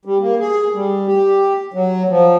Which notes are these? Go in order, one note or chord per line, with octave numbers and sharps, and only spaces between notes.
G3
A#3
G#4
G3
G4
F#3
F3